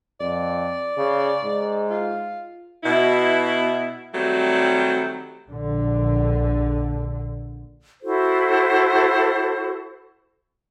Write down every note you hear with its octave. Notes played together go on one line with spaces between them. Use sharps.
F2 D5
C#3
G#2
F4
B2 E4
D#3 F#3 G3 A3 C4 G4
A#1 D3
E4 F#4 A4 C5